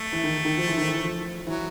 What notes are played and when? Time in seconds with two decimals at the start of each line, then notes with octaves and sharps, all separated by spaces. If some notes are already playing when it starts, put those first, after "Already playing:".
Already playing: A3
0.13 E3
0.24 D#3
0.45 D#3
0.57 F3
0.67 E3
0.77 D#3
0.87 E3
1.03 F3
1.47 E3 F#3